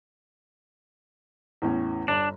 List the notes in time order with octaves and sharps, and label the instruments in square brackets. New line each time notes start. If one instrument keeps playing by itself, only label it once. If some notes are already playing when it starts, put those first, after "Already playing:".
[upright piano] E2 A2 C#4
[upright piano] G1 [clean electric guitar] D4